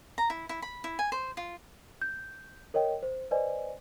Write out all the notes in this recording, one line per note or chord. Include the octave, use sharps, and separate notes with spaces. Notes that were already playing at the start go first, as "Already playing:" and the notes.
A#5
E4
E4
B5
E4
G#5
C5
F4
G6
A#4 C#5 D#5 G5
C5
B4 C5 D5 D#5 G#5